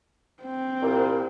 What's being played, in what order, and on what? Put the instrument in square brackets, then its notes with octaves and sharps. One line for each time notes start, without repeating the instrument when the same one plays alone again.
[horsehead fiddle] C4
[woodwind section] C2 A#2